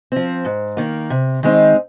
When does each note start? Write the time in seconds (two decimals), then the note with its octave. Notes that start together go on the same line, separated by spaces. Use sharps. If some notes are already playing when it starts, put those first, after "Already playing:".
0.12 F3 C4
0.45 G#2
0.77 D#3 A#3
1.10 C3
1.43 D#3 G#3 C4 D#4